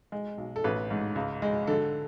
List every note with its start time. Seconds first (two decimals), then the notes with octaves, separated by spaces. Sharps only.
0.12 G#3
0.38 B1
0.56 A4
0.64 A1 B4
0.90 G#2
1.15 C#2
1.42 G#3
1.67 D3 A4